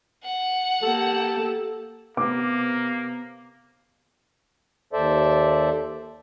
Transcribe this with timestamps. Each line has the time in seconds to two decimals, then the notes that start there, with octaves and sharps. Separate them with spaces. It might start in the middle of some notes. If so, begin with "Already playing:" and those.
0.24 F#5
0.83 A#3 G4 A4
2.17 C3 A#3 B3 D6
4.93 D#2 A4 C5 D5 E5